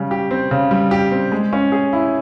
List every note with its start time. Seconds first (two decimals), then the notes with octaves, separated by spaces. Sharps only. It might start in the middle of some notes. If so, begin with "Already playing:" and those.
Already playing: C#3 G3
0.11 G4
0.31 C4
0.51 C#3
0.71 G3
0.91 G4
1.11 C4
1.32 G#3
1.53 C#4
1.72 G#4
1.93 E4